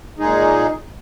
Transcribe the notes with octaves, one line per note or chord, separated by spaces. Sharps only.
A#2 G#3 D#4 G#4